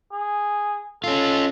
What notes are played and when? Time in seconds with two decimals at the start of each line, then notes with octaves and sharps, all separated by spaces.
0.13 G#4
1.04 C#4 F4 A4